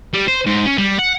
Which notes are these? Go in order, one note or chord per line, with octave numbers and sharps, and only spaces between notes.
G3
C5
G#2
C#4
G3
F#5